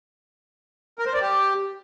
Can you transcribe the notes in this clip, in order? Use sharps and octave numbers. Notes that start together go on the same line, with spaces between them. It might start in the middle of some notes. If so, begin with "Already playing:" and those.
A#4
C5
D5
G4